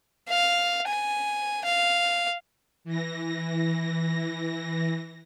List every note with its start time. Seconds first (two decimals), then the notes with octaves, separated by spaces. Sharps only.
0.29 F5
0.88 G#5
1.65 F5
2.84 E3 A#6